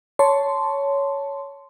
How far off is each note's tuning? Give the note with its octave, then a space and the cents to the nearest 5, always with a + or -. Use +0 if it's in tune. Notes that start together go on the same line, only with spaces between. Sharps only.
C#5 +10 A5 +0 C6 -10